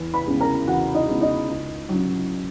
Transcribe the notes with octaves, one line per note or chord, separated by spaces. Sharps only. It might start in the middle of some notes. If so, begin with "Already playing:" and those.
Already playing: E2
B4 B5
C#3 G#3 B3
A#4 A#5
E2 F#4 F#5
D#4 D#5
C#3 G#3 B3
D#4 D#5
C#2
C#3 F#3